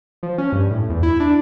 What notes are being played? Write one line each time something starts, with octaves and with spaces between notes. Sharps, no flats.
F3
C#4
G2
A2
E2
E4
D4